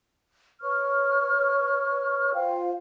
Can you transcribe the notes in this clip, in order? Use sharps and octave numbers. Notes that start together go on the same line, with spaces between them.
B4 C#5 C#6 F6
F4 C5 F5 G5